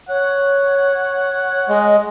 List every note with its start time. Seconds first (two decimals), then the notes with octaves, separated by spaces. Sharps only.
0.09 C#5 F#5
1.69 G#3 D#5